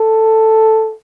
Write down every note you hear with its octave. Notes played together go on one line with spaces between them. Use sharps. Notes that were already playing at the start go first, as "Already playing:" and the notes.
Already playing: A4